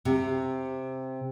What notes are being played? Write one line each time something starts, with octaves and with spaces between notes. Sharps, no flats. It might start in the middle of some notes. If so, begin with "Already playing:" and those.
C3